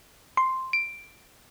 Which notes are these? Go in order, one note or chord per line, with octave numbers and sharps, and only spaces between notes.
C6
D7